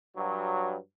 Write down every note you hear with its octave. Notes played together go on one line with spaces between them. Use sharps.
G2 F#3